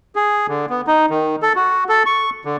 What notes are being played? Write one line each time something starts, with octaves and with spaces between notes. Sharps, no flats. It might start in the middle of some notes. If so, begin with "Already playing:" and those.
G#4
D3
B3
D#4
D#3
A4
F#4
A4
C#6
D3